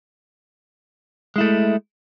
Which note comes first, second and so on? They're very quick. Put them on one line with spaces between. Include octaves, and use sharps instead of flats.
G#3 E4 A3